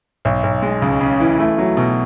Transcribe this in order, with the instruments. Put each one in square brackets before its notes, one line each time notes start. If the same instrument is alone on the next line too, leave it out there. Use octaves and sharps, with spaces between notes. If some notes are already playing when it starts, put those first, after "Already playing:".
[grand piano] B1
B1
G#3
C#2
C#3
E3
A3
F#3
B2